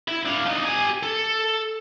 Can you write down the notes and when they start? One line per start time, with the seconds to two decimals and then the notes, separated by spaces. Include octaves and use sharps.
0.08 E4
0.25 D4 F5
0.46 D4 D#4
0.65 G4 G#5
1.03 A4